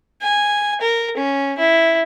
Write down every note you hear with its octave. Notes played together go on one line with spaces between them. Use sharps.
G#5
A#4
C#4
E4